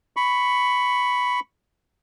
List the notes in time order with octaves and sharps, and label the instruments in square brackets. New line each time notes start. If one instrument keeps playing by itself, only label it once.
[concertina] B5 C#6